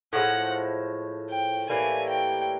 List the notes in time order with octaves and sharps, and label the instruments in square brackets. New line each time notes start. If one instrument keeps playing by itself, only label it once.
[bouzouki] A2 F3 G#3 [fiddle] F#5
[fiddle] G5
[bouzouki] A2 E3 G3 A#3 [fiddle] G#5
[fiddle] G5